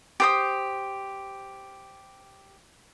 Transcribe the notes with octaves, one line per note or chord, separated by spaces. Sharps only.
G4 C5 D#6